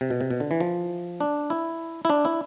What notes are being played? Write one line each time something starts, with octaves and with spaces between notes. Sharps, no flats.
C3
B2
C3
B2
D3
E3
F3
D4
E4
E4
D4
E4